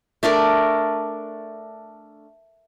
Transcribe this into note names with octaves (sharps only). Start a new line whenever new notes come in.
A3 D4 A#4 D5